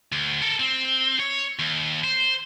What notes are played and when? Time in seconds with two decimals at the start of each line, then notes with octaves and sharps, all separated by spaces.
0.12 D2
0.42 A4 A#4
0.60 C4
1.20 C#5
1.59 D#2
2.04 C5